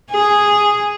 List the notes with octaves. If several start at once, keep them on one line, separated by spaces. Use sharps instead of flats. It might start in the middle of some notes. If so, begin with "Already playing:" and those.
G#4